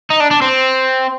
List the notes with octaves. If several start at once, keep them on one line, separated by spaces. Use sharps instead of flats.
D#4
D4
D4
C4